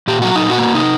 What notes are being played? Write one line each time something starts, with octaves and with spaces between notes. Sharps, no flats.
A#2 G4
F#3 F#4
D#4
A#2
F#4
A#3
C3 D#4